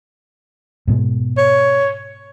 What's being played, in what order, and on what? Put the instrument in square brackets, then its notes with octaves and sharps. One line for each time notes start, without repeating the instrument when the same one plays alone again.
[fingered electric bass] G#2 B2 G#3
[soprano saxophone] C#5